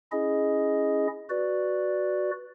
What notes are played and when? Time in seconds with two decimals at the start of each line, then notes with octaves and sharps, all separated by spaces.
0.12 C#4 E4 G#4 D#5
1.30 F#4 B4 D5